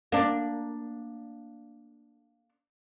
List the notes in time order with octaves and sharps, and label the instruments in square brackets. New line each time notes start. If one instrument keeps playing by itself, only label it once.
[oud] A#3 D4